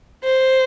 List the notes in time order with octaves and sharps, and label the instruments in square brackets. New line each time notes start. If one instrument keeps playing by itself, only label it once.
[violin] C5